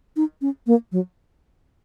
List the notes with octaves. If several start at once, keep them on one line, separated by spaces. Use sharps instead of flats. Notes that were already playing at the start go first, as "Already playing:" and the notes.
D#4
C#4
A#3
F#3